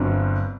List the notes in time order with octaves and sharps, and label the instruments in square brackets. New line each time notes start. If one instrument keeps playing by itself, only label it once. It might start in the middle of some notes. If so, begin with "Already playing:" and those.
Already playing: [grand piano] G1 G2 F#3 C4